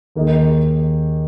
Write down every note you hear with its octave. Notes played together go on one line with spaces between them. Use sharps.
D#2 D#3 A#3 D#4 G#4